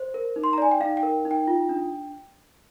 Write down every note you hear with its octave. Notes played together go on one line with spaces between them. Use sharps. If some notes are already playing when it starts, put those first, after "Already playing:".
Already playing: C5
A#4
D#4
C6
A#5
D5 G#5
G5
D#4 F5
G5
A#4
D#4
G5
F4
D4